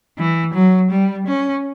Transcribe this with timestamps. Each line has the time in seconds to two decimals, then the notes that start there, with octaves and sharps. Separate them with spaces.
0.18 E3
0.54 F#3
0.90 G3
1.26 C#4